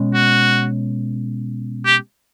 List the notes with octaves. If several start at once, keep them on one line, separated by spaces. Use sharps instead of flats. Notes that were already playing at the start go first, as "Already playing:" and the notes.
Already playing: B2 G#3 C#4
F#4
G4